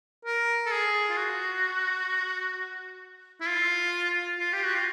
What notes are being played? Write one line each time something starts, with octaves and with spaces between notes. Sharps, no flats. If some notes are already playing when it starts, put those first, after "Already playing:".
A#4
A4
G#4
F4
F#4
E4
F4
F4
G4
F#4
F4